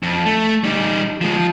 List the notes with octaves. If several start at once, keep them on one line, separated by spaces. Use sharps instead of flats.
F2
A3
G3 D#4
F3 G#3
F3